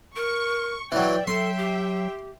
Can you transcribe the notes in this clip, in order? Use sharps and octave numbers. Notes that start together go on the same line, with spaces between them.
A#4 C#6
E3 F#3 D5 G5
F#3 A4 E5 G5 C6
G4